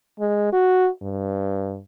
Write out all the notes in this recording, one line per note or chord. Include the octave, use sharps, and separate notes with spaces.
G#3
F#4
G2